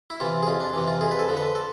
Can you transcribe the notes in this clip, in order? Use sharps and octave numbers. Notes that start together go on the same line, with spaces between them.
E4
C3 E3 F4
G#4
F2 F4
D4
C3 E3
F4
F2 G#4
B4
A4
D3 F3
B4
A4